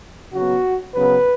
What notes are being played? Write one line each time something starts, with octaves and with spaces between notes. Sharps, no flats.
C#3 F#3 B3 F#4
C#3 F#3 B3 B4